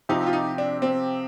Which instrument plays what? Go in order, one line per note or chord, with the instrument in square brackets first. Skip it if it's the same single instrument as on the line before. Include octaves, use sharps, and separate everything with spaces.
[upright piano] C3 F3 C4 G4 [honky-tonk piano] D#4
[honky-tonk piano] F4
D#4
D4
C4